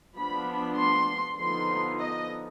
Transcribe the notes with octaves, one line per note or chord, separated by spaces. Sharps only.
F3 B3 D4 B5
C6
D3 F3 B3 D#4 C6
D#5